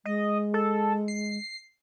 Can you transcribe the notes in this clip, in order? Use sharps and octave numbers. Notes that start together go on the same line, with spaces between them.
G#3 D#5
A4
C7